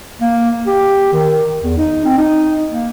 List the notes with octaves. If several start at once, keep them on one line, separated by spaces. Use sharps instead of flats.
A#3
G4
D#3
E2
D#4
C4
D#4
A#3